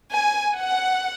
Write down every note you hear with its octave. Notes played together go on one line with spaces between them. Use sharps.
G#5
F#5